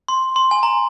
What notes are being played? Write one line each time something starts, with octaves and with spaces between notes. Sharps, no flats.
C6
C6
G#5
A#5